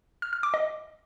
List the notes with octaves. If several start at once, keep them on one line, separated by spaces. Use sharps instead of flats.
F6
F6
D6
D#5